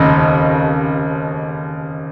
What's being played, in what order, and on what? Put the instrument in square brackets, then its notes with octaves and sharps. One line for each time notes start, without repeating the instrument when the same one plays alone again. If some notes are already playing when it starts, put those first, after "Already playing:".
Already playing: [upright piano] F1 D#2 C#3 D#5